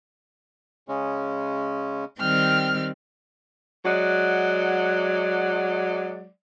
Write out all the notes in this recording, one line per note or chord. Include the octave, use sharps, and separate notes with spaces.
C#3 G#3 C#4
D#3 G3 C4 G5 F6
F#3 G#3 D5 F#5